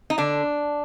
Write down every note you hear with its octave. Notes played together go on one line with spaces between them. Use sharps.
D#4
D3 D4